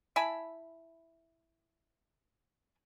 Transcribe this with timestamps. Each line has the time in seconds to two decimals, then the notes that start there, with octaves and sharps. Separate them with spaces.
0.16 E4 G#5 A5 B5